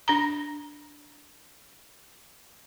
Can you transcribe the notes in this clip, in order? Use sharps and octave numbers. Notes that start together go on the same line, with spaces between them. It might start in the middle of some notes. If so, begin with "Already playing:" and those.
D4 A#5